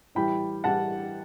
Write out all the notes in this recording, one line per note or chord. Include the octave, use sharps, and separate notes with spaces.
A2 E3 G3 G5 B5
A2 E3 G3 F#5 A5